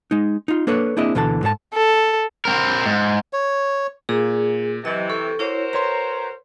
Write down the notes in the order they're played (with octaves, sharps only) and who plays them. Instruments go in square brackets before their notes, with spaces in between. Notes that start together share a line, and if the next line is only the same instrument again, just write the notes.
[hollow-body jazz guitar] G#3 D#4
D#4 F4
A#3 D4 A4 B4 C#5
A#3 C4 D4 E4 G#4 D#5
D2 B2 D3 E3 A4 A5
G#2 A4 C5 A5
[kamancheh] A4
[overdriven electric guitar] C4 A#4
G#2
[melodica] C#5
[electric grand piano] A#2 [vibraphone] G#4
[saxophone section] C3 E3 [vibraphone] F#3 D#5
[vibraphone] A4 [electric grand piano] C#6
[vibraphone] E4 C#5 [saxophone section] F#4 A#4 C5
[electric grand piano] B4 C#5 C6 [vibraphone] A#5